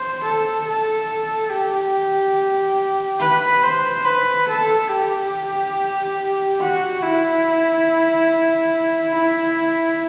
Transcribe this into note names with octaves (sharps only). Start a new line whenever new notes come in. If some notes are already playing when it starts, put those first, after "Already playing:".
Already playing: C5
A4
A4
G4
B4
C5
B4
A4
G4
F#4
E4
E4